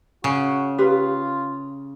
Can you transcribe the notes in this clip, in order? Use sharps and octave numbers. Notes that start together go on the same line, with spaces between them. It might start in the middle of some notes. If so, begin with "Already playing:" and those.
C#3 F#4
F4 G4 B4 F5